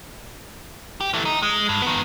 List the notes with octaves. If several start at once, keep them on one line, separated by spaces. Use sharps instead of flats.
G4
E3 A3
D#4
G#3
G2
D#3 B3